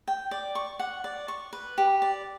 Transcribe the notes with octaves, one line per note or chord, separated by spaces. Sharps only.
G5
D5
C#6
F#5
D5
C#6
B4
G4
D5